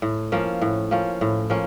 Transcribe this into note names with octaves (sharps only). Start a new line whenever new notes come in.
A2
F3 A#3 C#4
A2
F3 A#3 C#4
A2
F3 A#3 C#4